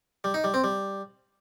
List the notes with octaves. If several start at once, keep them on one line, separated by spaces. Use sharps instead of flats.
G3
D#4
G3
C4
G3